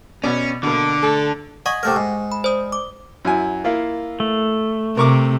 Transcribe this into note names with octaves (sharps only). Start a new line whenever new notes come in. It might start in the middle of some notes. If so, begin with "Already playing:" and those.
B2 B3 C#4 D5
B2 D3 A#3 D6
A3 A4
D#5 F#5 G#5 C#6
C3 A3 A#4
G#2
B5
C5 D5 D#6
D6
F#2 E4 G#5
A#3 E4 F4
A3
C3 A#4 C#6 D6